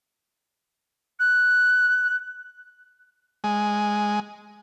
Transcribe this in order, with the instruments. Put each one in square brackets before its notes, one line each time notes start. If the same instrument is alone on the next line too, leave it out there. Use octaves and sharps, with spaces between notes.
[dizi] F#6
[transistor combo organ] G#3